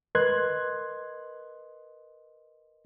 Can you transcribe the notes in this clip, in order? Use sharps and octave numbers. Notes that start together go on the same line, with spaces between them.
A#4 B4 D#5 C6 F#6 G#6